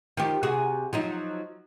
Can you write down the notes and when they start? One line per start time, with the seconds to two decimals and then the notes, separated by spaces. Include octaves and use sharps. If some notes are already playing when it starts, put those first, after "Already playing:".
0.17 D#3 F3 G4
0.43 C3 F#4 G#4
0.93 F3 F#3 D#4